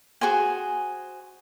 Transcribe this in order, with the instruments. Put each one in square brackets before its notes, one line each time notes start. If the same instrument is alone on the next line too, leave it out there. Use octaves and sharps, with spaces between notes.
[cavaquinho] F#4 G#4 C5 G#5